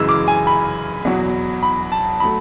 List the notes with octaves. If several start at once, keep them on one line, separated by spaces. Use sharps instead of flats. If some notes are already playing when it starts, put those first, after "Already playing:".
Already playing: F#2 C#3 E3 G#3 E6
D6
G#5
B5
E2 B2 F#3
B5
A5
F#3 A3 B5